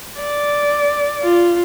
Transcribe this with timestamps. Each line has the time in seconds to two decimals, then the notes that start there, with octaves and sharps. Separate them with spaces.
0.20 D5
1.23 F4